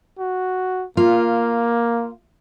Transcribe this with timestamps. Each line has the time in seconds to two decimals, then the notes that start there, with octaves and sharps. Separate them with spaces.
0.18 F#4
0.97 A#3 F4